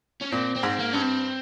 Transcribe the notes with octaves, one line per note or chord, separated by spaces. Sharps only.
C#4
A#2 C4
C4
G#2
A#3
G2 C#4
C4